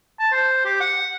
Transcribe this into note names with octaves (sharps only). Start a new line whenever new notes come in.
A5
C5
G4
F#5